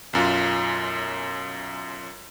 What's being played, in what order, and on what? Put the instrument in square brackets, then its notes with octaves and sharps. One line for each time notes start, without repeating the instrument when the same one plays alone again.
[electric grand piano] B1 F#2 F4